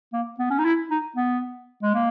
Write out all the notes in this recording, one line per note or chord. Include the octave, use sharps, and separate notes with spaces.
A#3
B3
C#4
D#4
E4
D#4
B3
G#3
A#3